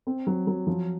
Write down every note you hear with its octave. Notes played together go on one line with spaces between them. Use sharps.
C4
F#3
F#3
F3